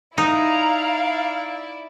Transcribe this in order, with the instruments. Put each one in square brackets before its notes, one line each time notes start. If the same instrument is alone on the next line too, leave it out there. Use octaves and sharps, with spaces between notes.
[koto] D#4 [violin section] E4 D5 [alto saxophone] F5 [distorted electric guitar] A#5